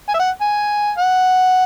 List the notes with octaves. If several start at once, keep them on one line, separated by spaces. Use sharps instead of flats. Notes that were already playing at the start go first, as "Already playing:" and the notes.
G#5
E5
F#5
G#5
F#5